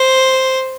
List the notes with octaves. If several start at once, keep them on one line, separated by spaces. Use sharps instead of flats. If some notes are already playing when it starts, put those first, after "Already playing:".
Already playing: C5